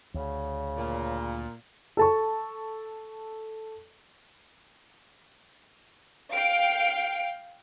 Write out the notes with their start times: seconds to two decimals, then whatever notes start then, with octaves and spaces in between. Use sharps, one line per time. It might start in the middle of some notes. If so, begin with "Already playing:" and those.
0.14 D2 C#3 C#5
0.78 A#2
1.97 A4 A5 C#6
6.33 F5 G5 D7